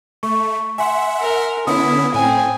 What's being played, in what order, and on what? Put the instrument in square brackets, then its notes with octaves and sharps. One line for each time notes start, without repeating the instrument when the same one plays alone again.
[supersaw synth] A3 [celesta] C#6
[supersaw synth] E5 F#5 [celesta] G#5 C6
[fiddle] A#4
[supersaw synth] D3 B3 C#4 [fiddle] E4 [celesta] D#6
[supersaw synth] A2 [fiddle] C4 G#5